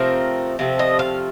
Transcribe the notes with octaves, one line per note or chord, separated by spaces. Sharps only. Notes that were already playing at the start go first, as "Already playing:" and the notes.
Already playing: C3 F3 A3 C4 A#4
C3 F3 A3 C4
D#5
F5